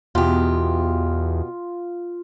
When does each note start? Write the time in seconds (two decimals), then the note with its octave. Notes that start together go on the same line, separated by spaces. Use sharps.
0.15 E2 B2 F4 G4